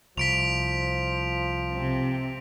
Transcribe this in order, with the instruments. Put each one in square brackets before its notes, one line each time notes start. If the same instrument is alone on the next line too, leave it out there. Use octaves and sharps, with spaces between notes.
[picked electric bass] C2 [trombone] F3 [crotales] B6 D7 F7
[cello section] C3 C4